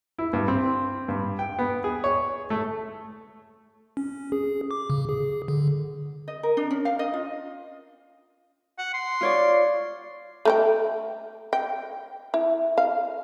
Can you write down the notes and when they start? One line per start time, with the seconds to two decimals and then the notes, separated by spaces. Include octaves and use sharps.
0.18 E4
0.33 G2
0.48 C4
1.08 G2
1.39 G5
1.59 B3
1.84 G#4
2.04 C#5
2.50 A3
3.97 C#4
4.32 G#4
4.71 D6
4.90 C#3
5.09 G#4
5.48 D3
6.28 D#5
6.43 A#4
6.57 D4
6.71 C#4
6.85 F5
6.99 D#5
7.14 F4
8.79 F#5
8.94 C6
9.21 F4 C#5 D5
10.45 A3 A#4 G5
11.53 G5
12.34 E4
12.78 F5